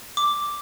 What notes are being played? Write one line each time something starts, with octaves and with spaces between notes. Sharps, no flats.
D6